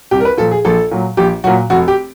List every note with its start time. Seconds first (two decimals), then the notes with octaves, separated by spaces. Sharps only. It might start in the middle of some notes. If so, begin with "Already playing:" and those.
0.11 C2 G4
0.20 A#4
0.25 B4
0.37 A#2 F3 A4
0.51 G#4
0.65 A#1 A4
0.91 A#2 F#3
1.17 A#1 G4
1.44 F#3 F#4
1.47 A#2
1.70 F1 F#4
1.88 G4